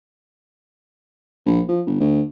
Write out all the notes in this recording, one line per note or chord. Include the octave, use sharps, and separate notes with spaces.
A#1
F3
G1
D2